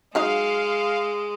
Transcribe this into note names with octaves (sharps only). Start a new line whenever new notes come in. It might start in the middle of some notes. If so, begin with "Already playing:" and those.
F#3 G#3 D#4 D#5 F5